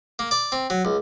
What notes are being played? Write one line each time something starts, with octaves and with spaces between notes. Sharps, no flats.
A#3
D5
C4
F#3
C#2